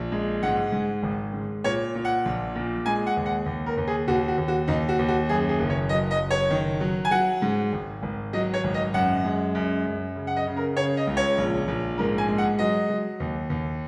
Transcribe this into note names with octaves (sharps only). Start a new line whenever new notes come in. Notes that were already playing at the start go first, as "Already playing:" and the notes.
Already playing: A#1
G#3
G#2 F#5
G#2
G#1
G#2
A#2 C#5
A#2
F#5
A#1
A#2
G#3 G#5
F#5
D#2
F#5
D#2
A#4
D#2
G#4
D#2 F#4
F#4
D#2
F#4
D#2 D#4
F#4
D#2
F#4
F#2 G#4
G#4
F#1
C#5
F#3 D#5
D#5
F#1
C#5
D#3
F#3
G#5
F#3 F#5
G#2
G#1
G#1
F#3 D#5
C#5
G#1
D#5
F#2 F#5
G#3
F#2
F#2
C#3
F#5
D#5
C#3
A#4
C#3 C#5
D#5
C#2
C#5
A#1
A#1
G#2 A#4
G#5
G#3
F#5
F#3 D#5
F#3
D#2
D#2